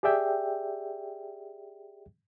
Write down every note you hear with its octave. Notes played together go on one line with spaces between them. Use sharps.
G4 G#4 D5 E5 G5